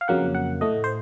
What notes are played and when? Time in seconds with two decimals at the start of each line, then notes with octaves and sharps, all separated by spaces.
0.01 F5
0.08 F2 C#3 F#3 A#3 F#5
0.35 F#5
0.61 A2 A3 D#5
0.84 C5